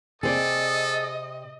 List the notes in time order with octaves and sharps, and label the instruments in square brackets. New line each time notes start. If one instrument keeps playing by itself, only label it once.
[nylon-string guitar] C3 C5 D5 [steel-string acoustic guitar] G#4 [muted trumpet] A4 [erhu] D#5